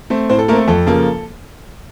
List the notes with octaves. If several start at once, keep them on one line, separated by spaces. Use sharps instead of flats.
A3 C4
A2 C4 C5
A4
A3 A#3 C4 A4 A#4
F2 A4
C#3 F3 A#3